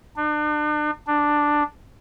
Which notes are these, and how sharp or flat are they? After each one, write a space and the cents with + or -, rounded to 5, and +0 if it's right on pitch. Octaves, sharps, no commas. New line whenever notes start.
D4 +40
D4 +5